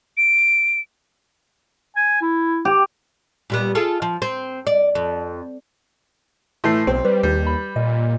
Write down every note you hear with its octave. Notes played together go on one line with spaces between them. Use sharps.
D7
G#5
E4
G4
A#2 G3 B3
F4 G#4 A4
F3
C4
D5
F2
A2 E3 A3 C6 C7
B1 C4
G3 B4
D#2 G3
B5
A#2 D#5